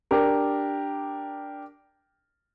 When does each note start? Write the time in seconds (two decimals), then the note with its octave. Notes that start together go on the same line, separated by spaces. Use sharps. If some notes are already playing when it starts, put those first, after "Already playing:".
0.11 D4 G4 A#4